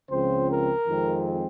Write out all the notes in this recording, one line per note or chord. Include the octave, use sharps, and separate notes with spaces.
C#2 C#3 F3 C4 C5
A#4
F2 D#3 G#3 C4